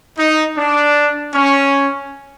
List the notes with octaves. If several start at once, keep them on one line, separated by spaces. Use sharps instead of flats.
D#4
D4
C#4